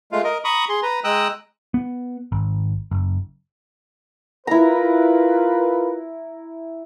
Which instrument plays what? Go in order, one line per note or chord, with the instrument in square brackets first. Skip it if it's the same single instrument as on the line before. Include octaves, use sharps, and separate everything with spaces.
[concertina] G#3 A3 F4 F5
A#4 D#5
A#5 B5 C#6 D#6
G#4 C6
B4 A#5
G#3 G5 A#5 D#6 E6 F#6
[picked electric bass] B3
G#1
F#1
[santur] E4 A#5 [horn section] F4 A#4 B4